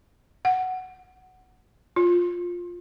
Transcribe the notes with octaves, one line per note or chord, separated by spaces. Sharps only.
F#5
F4